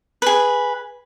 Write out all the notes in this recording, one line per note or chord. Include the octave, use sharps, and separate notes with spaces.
G#4 B4